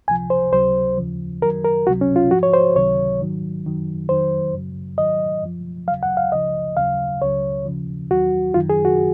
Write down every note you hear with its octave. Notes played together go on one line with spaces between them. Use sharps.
C#2 C3 F3 G#5
C5
C#2 C3 F#3 C5
D#2 C#3 F3
F#2 D#3 F#3 A#4
A#4
C#2 C3 F#3 F#4
C#4
F4
G#2 F3 F#4
C#5
C5
C#2 C3 D#3 F#3 C#5
G#2 D#3 F#3
F#2 D#3 F#3
F2 D#3 F#3 C5
F#2 C#3 F#3
G#2 D#3 F#3 D#5
F#2 F3
D#2 C#3 F#3 F5
F#5
F5
C#2 C#3 F3 D#5
D#2 C#3 F#3 F5
C#2 C#3 F#3 C#5
D#2 C#3 F3
D#2 D#3 F#3 F#4
F#2 D#3 F#3 F4
G#4
F#4